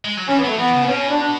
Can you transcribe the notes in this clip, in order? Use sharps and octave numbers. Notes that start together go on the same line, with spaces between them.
G#3
F#3
E3 C#4
B3
F#3 A3
E3 B3
C#3
B3
B2 C#4
D4
D4